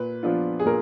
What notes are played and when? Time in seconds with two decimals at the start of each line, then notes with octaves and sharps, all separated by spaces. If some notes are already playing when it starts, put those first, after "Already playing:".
Already playing: A#2 B4
0.23 F3 B3 D4 F4
0.60 G#4
0.66 A#2 A#4